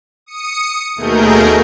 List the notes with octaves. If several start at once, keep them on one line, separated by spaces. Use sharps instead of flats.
D#6 C#7
D#2 B2 A3 G#4 A#4 G6